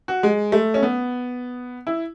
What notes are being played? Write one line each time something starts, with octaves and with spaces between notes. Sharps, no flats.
F#4
G#3
A3
C#4
B3
E4